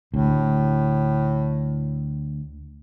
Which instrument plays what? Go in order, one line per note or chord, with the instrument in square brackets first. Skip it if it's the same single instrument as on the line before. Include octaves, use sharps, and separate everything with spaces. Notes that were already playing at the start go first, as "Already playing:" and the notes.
[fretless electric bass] D2 [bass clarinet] A2